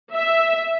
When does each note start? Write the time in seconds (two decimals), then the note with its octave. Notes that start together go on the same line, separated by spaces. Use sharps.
0.12 E5